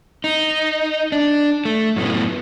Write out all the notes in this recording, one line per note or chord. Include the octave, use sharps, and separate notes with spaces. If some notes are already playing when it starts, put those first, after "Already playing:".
D#4
D4
A3
F#2 A2 B3